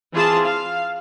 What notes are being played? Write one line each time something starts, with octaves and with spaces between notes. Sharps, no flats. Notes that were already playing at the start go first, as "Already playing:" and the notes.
E3 C4 F4 G#4 A5 C6
F5